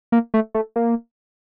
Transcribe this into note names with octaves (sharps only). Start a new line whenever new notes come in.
A#3
A3
A3
A#3